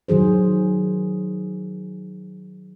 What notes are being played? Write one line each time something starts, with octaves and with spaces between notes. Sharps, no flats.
D#3 F#3 G#4 C5